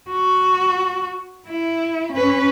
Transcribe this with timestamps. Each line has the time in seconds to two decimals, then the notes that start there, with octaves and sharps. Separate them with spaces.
0.10 F#4
1.48 E4
2.12 C#4 B4